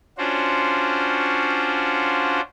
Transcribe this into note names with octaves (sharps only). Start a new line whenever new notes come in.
C#4 D4 F4 F#4 C5